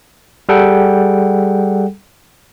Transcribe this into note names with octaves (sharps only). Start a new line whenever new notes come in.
G3 G#4 A4 F#5 G5